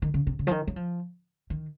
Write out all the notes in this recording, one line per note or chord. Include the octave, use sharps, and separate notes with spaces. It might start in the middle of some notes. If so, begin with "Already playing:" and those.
D#3
C#3
C3
C#3
F3
D#3
F#3
F3
D#3